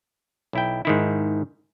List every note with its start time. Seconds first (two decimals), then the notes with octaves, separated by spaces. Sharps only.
0.53 B1 E4 G5
0.85 G#2 D#3 E4